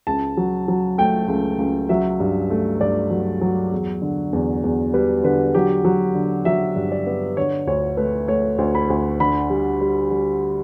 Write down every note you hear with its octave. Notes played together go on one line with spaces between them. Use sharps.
C#2 A5
F#3
F#3
A3 G5
C#2
C#2
F#3 E5
G2
A3
G2 D5
F#3
F#3
E2
D3
E2
E2
G3 B4
D3 B4
F#3 G4
F#3
D3
F#3 E5
G2
D5
B3
D3 C#5
D2 C#5
A3 B4
A3 C#5
D2
B5
D2
D3 B5
G3
G3
G3